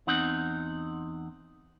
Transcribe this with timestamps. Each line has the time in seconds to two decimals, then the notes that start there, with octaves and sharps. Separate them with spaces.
0.07 E2 C4 D#4 F#5